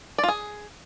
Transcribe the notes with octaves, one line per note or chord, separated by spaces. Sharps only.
D5
F4
G#4